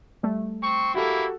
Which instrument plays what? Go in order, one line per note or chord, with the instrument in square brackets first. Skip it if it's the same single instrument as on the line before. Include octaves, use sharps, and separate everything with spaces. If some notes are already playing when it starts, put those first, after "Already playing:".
[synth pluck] G3 A3
[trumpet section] C4 C#6
[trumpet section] A#3 E4 [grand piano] F#4 G4 A4